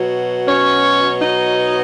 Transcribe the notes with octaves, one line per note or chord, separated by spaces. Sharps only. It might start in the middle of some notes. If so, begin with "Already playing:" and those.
Already playing: B2 F#3
C#4 C#5
D#4 D#5